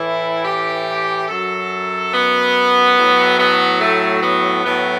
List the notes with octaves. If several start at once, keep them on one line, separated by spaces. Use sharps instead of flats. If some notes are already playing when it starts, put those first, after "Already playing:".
Already playing: A2 E3 E4
G4
F#2 F#3 A4
B3
A2 F#3
B3
A3
B3
A2 F#3 B3